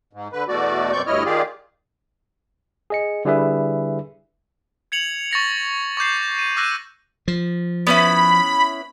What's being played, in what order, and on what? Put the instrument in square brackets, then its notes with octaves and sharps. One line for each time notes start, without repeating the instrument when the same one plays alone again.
[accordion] G#2
D3 B4
E2 B2 A3 F#4 D5
F#2 B2 C4 D5 C#6 G6
D2 G2 E4 C#5 D#5 F6
D#3 F4 G4 G#4 D5
[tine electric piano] G#4 D#5 C#7
D3 G3 E4 G#4 B4 E5
[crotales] G#6 C#7 F7 F#7
C#6 A6 A#6 C#7
C#6 D6 G6 C7
D#7
D6 E6 F#6 A#6 D#7
[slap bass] F3
[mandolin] B3 C#4 E4 [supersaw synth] B5